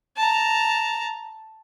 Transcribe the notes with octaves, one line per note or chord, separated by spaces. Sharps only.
A5 A#5